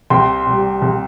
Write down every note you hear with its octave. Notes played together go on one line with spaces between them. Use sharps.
C2 G5 C6
C3 G3
C2